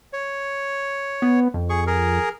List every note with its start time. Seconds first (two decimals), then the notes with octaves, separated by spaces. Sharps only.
0.13 C#5
1.22 B3
1.54 F2
1.70 G#4 C#6
1.87 G#4 A#4